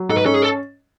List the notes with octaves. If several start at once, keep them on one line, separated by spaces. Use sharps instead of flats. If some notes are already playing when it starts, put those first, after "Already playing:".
Already playing: F#3
G#2 A4
B4
C#4 A4
G#4
A4